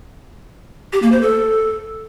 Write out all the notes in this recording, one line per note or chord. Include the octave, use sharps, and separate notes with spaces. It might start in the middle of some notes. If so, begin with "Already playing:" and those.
G4
A#3
C5
A4